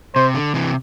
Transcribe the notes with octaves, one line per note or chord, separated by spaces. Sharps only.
C3 C5
D3
C3 E3